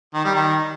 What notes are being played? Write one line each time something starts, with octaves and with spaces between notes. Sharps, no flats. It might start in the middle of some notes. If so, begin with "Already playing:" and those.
D#3
G3
D#3